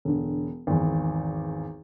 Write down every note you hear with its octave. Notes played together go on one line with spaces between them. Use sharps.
E1 D3
G#1 E2